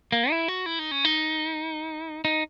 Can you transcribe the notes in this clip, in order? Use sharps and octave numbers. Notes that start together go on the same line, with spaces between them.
A#3
E4
F#4
E4
D#4
C#4
D#4
D#4